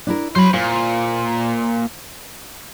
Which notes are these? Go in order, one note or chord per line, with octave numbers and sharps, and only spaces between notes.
D4 E4 A#4
F#3 C5 B5
A#2 C5